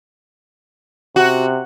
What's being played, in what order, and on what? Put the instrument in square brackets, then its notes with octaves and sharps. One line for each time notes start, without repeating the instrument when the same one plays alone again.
[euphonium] C3 [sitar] F#4